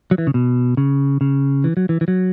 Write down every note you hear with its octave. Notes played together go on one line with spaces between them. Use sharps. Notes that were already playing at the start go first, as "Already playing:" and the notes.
F#3
E3
C#3
B2
C#3
C#3
E3
F#3
E3
E3
F#3